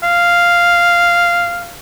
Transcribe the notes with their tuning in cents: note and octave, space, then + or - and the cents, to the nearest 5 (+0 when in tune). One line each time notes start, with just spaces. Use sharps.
F5 -5